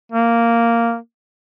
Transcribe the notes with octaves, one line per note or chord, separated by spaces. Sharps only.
A#3